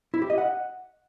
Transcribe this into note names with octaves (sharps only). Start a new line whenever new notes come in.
E4
G4
D#5
F#5